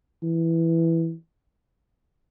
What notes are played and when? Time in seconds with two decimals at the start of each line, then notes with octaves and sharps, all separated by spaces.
0.23 E3